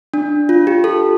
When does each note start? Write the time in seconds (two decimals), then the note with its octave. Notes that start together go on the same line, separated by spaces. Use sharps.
0.14 D4
0.49 F4
0.67 G4
0.84 A4